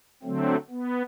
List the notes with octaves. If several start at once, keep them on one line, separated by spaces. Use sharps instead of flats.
D3 F#3 A3 C4
B3